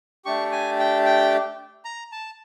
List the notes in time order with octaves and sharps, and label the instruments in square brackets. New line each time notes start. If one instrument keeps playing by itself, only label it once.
[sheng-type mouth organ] A3 D4 G4 C#6
G#5
G5
G5
A#5
A5